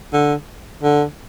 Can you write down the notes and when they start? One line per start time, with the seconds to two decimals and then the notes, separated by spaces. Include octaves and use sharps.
0.13 D3
0.83 D3